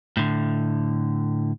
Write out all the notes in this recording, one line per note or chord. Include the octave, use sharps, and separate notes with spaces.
A2 D3